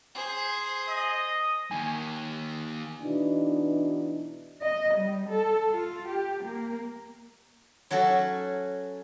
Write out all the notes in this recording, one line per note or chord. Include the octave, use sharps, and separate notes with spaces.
G#4 C5
D#5
D#2 G#5
B2 E3 D4 D#4
D#5
G3
A4
F4
G4
A#3
F#3 C#4 F#4 A4